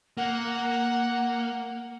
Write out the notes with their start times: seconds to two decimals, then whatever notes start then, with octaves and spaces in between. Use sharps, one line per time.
0.17 A#3 F#5